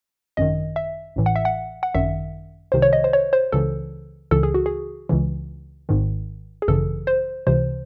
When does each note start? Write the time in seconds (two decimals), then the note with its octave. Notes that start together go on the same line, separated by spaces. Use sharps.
0.37 G#1 F#2 D#3 D#5
0.76 E5
1.16 A1 A2 E3
1.26 F#5
1.36 E5
1.45 F#5
1.83 F#5
1.95 G#1 F#2 D#3 E5
2.72 C2 C3 D#3 C5
2.82 C#5
2.93 D#5
3.04 C5
3.13 C#5
3.33 C5
3.52 C#2 C#3 E3 A4
4.31 C#2 C#3 E3 A4
4.43 G#4
4.54 F#4
4.66 G#4
5.09 C#2 C#3 E3
5.89 G#1 G#2 D#3
6.62 G#4
6.68 G#1 F#2 C#3 E3 A4
7.07 C5
7.47 C#2 C3 E3 C5